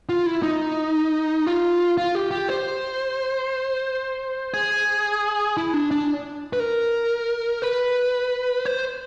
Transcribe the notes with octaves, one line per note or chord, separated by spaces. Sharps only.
F4
E4
D#4
F4
F4
G4
G4
C5
G#4
E4
D4
D4
B4
A#4
B4
C5